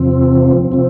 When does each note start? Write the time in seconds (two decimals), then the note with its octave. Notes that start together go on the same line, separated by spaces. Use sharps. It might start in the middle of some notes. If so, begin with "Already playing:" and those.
Already playing: E2 C3 F3 C4
0.72 C3 F3 C4